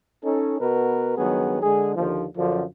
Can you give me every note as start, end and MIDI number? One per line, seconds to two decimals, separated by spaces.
0.24 0.58 61
0.24 0.58 63
0.24 0.58 69
0.60 1.16 47
0.60 1.16 59
0.60 1.16 66
0.60 1.16 70
0.60 1.16 71
1.17 1.57 37
1.17 1.57 43
1.17 1.57 51
1.17 1.57 54
1.17 1.57 59
1.17 1.57 68
1.62 1.94 50
1.62 1.94 56
1.62 1.94 68
1.96 2.25 39
1.96 2.25 50
1.96 2.25 53
2.37 2.64 42
2.37 2.64 50
2.37 2.64 53